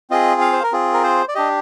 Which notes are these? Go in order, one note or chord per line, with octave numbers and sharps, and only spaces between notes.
C4 F4 G#4 D#5
F5
C5
A#4
C4 F4 G#4
A#4
C5
D5
D4 G4 D#5